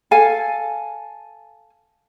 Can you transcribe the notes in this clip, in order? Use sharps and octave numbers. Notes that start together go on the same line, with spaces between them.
A4 F5 G#5